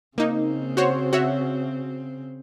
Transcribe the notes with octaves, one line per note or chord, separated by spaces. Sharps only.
C#3 A#3 C4 D#4
F#4 C5 C#5
F#4 C#5 E5